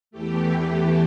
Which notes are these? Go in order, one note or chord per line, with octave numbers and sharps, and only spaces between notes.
E2 E3 A3 G4